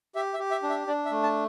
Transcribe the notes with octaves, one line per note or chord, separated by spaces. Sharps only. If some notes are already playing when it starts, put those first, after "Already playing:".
G4 E5
E5
G4
E5
D4
E5
D4 D5
E5
A3
A5